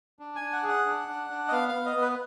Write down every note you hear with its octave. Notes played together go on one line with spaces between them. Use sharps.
D4
G#5
D4
F#5
G#4
F#5
D4
D4
D4
D#5
B3 F5
F5
B3
D#5
B3
B4